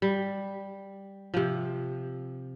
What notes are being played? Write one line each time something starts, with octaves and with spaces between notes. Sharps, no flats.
G3
C3 F3